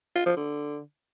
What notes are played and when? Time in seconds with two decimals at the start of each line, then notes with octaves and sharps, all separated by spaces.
0.15 F4
0.26 F3
0.37 D3